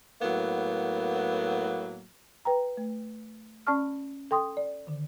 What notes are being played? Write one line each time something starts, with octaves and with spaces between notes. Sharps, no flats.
A2 F#3 A#3 B3
B4 G5 A#5
A3
C#4 D5 A5 C#6 F6
A4 G5 C6 D#6
D5
D3 D#3